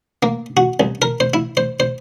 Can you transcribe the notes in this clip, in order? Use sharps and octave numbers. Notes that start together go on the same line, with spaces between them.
A#3
F#4
C2
A#4
C5
E4
C5
C5